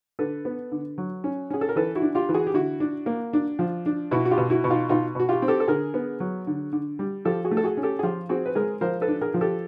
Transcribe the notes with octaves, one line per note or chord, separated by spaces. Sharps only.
D3 A4 B4
B3
D3
F#3
C#4
C#4 G#4
A4
A#4
E3 A4 B4
E4 F#4
D4
F4 G4
E3
F#4 G#4
G4
D3 E4 F#4
D4
A#3
D4
F3
D4
B2 E4 F#4
F#4
F4 G4
B2
E4 F#4
B2
D#4 F4
B2 D#4 F4
B2 F#4
F4 G4
C4
G4 A4
A4
D3 G#4 A#4
B3
F#3
D3
D3
G3
F3 G4 A4
F#4 G#4
A3
A4
F#4 G#4
C#4
G4 A4
G#4
F3 F4 G4
C4 F#4 G#4
B4
G#3 G#4 A#4
F3 A#4 C5
A4 B4
D4
G#4 A#4
F3
G4 A4